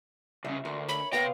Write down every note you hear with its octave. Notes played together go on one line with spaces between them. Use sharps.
C2 C#3 E5
D2 A#4
C#5 B5
C3 B3 F5 G5 A#6